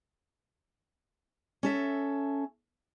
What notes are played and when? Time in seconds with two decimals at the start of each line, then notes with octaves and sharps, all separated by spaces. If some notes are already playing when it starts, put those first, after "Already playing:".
1.63 C#4 A4 E5